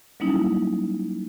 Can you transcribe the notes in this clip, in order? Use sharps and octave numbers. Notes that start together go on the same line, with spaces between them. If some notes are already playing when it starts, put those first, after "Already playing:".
F#3 G3 A#3 C#4 D#4 E4